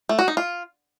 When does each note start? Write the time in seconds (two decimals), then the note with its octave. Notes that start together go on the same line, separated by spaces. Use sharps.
0.09 A3
0.19 F#4
0.28 D#4
0.37 F4